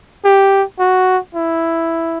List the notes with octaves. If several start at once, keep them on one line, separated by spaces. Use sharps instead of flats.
G4
F#4
E4